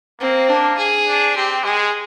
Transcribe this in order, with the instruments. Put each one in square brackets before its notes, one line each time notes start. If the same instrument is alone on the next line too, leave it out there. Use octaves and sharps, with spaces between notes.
[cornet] A#3 [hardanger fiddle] C4
[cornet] A#3 [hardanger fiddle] D4
[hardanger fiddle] G#4
[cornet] D4
[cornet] C4 [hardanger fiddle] G4
[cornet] G#3 [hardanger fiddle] G#4